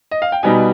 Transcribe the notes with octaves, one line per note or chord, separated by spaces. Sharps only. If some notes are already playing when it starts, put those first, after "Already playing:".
D#5
F5
G5
B2 G3 B3 D#4 G#5